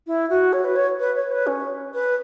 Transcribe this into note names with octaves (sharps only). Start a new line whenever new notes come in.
E4
F#4
C#5
B4
C#5
B4
C#5
B4
C#4
B4